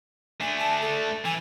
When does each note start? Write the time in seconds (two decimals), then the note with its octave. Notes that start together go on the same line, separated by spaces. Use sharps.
0.41 A3 D4 G#5
0.58 A5
0.82 A4
1.25 E3 G#5